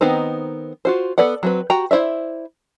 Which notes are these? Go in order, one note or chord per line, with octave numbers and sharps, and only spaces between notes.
D#3 B3 C4 D#4 C5
F4 F#4 C5
B3 A4 B4 D5 F#5
F#3 C4 B4
F#4 G4 G5 A#5
E4 C5 D5 E5